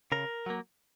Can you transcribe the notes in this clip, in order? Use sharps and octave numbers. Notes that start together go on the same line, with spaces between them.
C#3 A#4
F#3 A#3